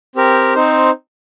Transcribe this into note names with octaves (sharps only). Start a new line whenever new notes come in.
C4 G4 A#4
C4 D#4 C5